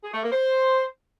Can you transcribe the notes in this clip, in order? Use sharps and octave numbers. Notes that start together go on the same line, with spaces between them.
G#4
A3
A#3
C5